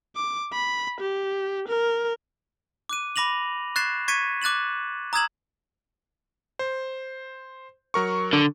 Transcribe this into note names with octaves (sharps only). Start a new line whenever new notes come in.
D6
B5
G4
A#4
D6 F#6 D#7
B5 D6 A#6 F7 F#7
C#6 F#6 G#6 A6 C7 E7
C#6 G#6 A6 B6 C#7 D#7
D6 F#6 A6 E7 F#7
A#5 D#6 E6 G#6 E7 F#7
C5
F#3 A#4 C#6
D3